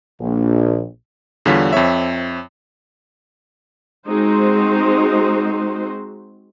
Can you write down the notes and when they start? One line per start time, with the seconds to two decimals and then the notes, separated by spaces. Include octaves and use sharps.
0.20 A#1
1.45 E2 D3 G3 F4 C#5 B6
1.73 F2 C4 C#5 E5
4.08 G#3 C4 D#4 F#4 C5